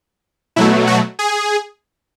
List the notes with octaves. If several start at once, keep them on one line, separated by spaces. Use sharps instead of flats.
B2 F#3 A3 E4
F#4
G#4